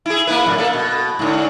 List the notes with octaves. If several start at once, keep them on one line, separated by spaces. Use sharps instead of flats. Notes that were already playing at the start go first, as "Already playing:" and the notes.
E4 G#4
A#3 E4 B4
F#2 A2 D3
A#3 A4
B2
G#2 D3